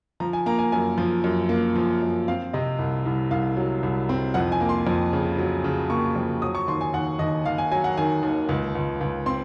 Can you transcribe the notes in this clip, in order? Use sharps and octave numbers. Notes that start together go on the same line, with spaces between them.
F3 A#5
G#5
A#3 A#5
G#5
F#2 G#5
F3
F#2
A#3
F3
F#2
C4 F5
C3 D#5
C2
C2
C2 F5
F#3
C2
C4
F2 F#5
G#5
A#3
C6
F2
C#3
F#3
C#3
A#3 C#6
F2
F#3 D#6
C#6
D#2 C6
G#5
D#2 F#5
D#2 D#5
D#2 F5
G#5
F#3 G#5
F#5
D#3 G#5
D#2
C#2
C#2
C#2
C4 C6